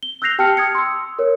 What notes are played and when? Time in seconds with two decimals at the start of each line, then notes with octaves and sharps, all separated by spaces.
0.03 G7
0.22 E6 F#6 G6 A#6 C7 F7
0.38 G4 G5 A5 F6 C#7
0.57 D#6 G#6 C#7
0.75 C6 E6
1.19 A#4 C#5